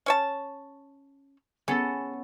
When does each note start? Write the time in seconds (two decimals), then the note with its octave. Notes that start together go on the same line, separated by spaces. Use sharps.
0.06 C#4 C#5 A5
1.68 B3 C#4 G#4 A4